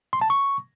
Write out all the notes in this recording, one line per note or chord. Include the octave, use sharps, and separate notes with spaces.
C6
A5
C#6